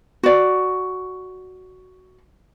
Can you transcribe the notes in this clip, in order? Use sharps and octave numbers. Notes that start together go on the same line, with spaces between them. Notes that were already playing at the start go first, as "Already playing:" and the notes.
F#4 D5